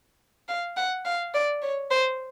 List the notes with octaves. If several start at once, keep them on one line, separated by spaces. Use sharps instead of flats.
F5
F#5
F5
D5
C#5
C5